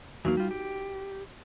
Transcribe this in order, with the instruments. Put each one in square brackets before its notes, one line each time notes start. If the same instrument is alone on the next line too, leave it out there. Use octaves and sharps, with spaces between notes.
[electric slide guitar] E2 F#3 A#3 [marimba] D#4 F#4
[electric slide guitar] G3 F4
G4